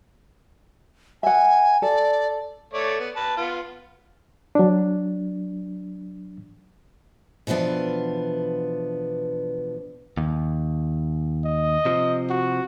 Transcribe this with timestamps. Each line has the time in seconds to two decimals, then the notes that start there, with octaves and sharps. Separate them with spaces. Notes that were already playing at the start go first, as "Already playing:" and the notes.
1.23 E5 F#5 G#5
1.82 A4 D5
2.74 A3 C#5 D5
3.00 B3
3.16 B4 A5
3.37 B3 F4
4.55 F#3 D4
7.47 B2 E3 F3 B3 D4
10.17 D#2
11.45 D#5
11.85 C3 F3
12.30 F#4